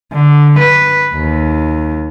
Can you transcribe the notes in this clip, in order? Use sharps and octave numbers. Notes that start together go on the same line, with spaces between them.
D3
B4
D#2